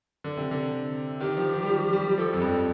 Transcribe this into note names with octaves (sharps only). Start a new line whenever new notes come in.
D3
C3
D3
D#3 G4
F3
D#3
G3
F3
G3
G3
F3 A4
F2
G2